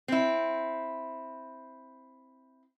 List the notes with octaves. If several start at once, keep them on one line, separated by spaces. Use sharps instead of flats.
C4 E4